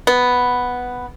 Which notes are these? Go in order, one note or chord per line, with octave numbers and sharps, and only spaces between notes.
B3